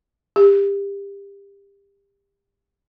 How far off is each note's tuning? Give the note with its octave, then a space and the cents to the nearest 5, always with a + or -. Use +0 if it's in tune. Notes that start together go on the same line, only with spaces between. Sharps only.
G4 +25